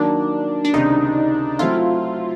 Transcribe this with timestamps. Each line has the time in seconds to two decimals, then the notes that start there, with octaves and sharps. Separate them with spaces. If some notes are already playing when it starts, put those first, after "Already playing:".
Already playing: D#3 F#3 A#3 D4
0.65 D4
0.73 C#2 C3 D#3 D#4
1.59 F#3 A3 C4 E4 F4 A4